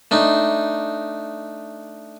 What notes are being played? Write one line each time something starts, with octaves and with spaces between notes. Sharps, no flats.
A3 D4 D#4